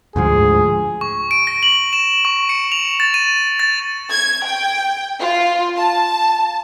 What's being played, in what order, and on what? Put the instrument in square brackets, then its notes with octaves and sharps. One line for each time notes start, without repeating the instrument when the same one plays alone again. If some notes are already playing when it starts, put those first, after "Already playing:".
[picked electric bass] D2 G#2 F3 [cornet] G#4
[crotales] C#6
D7
A#6
F#7
E7
C#6
C#7
F7
A6
D#7
A6
[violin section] G#6
G5
F4
A5